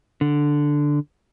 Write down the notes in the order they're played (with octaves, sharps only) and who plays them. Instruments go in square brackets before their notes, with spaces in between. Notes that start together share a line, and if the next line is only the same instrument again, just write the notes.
[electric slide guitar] D3